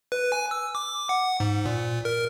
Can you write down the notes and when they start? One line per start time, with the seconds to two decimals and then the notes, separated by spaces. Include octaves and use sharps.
0.12 B4
0.32 G#5
0.51 E6
0.75 D6
1.09 F#5
1.40 G#2
1.65 A#2
2.05 A#4